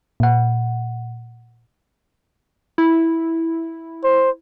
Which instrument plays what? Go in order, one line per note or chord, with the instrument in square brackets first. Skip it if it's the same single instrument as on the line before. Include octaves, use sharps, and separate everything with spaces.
[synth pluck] A#2 F#5
[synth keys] E4
[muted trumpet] C5